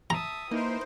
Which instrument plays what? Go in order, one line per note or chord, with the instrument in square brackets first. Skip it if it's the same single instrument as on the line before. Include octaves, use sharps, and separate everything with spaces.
[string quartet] E5 A5 D#6 [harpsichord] A#5
[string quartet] E3 A#4 [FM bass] A#3 [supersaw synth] D#4 C5